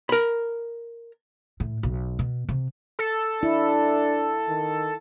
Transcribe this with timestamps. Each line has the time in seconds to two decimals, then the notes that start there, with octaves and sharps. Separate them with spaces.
0.09 A#4 B5
1.60 A2
1.83 B1
2.19 B2
2.49 C3
2.99 A4
3.43 D4 E4
4.48 D#3